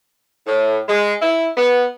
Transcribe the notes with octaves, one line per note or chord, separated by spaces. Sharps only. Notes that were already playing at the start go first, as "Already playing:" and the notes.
A2
G#3
E4
B3